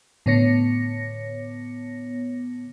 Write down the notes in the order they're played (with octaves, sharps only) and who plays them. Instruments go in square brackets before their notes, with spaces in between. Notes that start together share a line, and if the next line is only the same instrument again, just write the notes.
[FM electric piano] A2 D3 B3 C#5 A#6 C#7